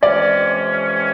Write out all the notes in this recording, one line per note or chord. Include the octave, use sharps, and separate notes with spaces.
F2 C3 E3 G#3 C#4 D5